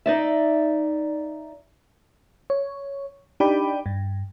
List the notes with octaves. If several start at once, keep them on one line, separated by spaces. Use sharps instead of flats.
D#4 D5 E5
C#5
D4 D#4 G4 D5 G5 B5
G2